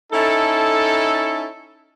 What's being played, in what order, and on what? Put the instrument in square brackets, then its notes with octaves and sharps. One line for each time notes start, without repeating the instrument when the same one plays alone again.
[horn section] C#4 D#4 E4 A4